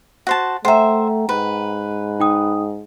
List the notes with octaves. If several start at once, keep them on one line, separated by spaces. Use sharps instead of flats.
F#4 C5 A5
A3 C5 E5 F#5 G5 A#5
G#2 B4
D#4 G5 D#6